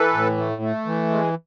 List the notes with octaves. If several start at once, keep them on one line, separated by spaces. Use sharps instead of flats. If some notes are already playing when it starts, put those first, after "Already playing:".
Already playing: E3 A4 B4
A2
A3
A3
E3
G#3